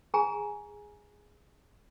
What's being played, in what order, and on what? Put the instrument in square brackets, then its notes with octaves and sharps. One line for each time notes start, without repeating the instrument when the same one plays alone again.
[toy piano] G#4 G#5 A#5